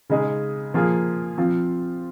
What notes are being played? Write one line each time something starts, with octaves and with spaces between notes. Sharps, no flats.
C#3 G#3 D#4 G#4
F3 A#3 F4 G#4
F3 C4 F4